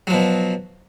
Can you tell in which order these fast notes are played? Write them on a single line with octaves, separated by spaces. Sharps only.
F#3 F3 B2